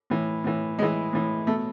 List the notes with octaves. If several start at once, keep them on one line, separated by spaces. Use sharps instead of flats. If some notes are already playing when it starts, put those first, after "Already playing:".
A2 E3
A2 E3
A2 E3 G#3
A2 E3
B2 A3